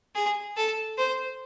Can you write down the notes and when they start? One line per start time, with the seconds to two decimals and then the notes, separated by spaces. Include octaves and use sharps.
0.15 G#4
0.57 A4
0.98 C5